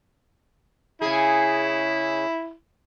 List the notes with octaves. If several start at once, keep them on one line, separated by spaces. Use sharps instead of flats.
C#3 E4 G#4